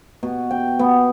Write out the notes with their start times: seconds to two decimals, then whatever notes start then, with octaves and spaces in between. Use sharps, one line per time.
0.23 B2
0.51 G5
0.79 B3